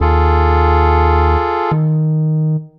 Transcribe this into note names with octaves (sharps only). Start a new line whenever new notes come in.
D#2 F4 G#4 A4
D#3